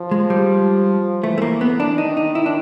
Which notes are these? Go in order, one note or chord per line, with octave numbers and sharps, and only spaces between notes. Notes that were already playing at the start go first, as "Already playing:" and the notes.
Already playing: F3
G#3
G3
E3 A3
A3
A#3
B3
D4
D#3 D#4
D#4
E4
D4